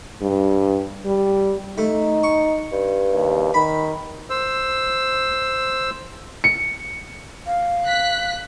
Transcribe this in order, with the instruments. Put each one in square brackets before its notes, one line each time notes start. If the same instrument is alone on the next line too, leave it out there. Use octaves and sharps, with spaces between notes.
[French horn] G2
G3
[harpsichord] A3 [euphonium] D#4
[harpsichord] C#6
[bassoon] G2
[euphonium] D#2
[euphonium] D#3 [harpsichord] B5
[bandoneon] C5 E6
[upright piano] C#7
[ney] F5
[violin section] F#6 B6